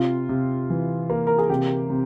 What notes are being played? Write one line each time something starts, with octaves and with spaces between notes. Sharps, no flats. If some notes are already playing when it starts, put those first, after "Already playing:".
Already playing: C3 F4
C3
E3
A#3
A#4
G#4
C3 G4
C3